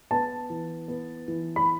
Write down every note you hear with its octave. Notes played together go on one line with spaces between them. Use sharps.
B3 A5
E3
B3
E3
B5